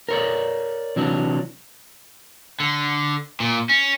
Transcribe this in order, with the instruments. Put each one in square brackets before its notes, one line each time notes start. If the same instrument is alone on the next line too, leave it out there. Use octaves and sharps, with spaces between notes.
[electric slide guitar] A#4 C#5 D5
C3 E3 F#3 D4
[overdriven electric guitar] D3
A#2
C#4